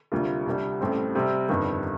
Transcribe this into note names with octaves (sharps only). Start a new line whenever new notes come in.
D2 C3 G3 A#3 F4
C2 C3 G3 D4
A1 A2 G3 C4
C3 G3 C4
G1 F2 D#3 G3